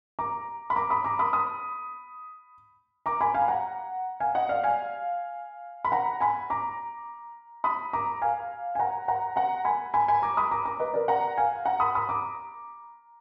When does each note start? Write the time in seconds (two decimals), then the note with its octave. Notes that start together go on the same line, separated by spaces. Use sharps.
0.19 A#5 D6
0.70 B5
0.76 A#5 D6
0.90 B5 D#6
1.04 A#5 D6
1.19 B5 D#6
1.33 B5 D#6
3.06 A#5 D6
3.21 G#5 B5
3.34 F5 G#5
3.48 F#5 A#5
4.20 F5 G#5
4.35 D#5 F#5
4.49 D5 F5
4.63 F5 G#5
5.85 B5
5.92 F#5 A#5
6.21 G#5 B5
6.50 A#5 D6
7.64 B5 D#6
7.93 A#5 D6
8.22 F5 G#5
8.75 G#5
8.79 F#5 A#5
9.08 F#5 A#5
9.36 F#5 A#5
9.65 G#5 B5
9.94 G#5 B5
10.08 G#5 B5
10.22 A#5 D6
10.37 B5 D#6
10.51 A#5 D6
10.65 A#5 D6
10.80 B4 D#5
10.94 A#4 D5
11.08 F#5 A#5
11.37 F5 G#5
11.65 F#5 A#5
11.80 B5 D#6
11.95 B5 D#6
12.09 A#5 D6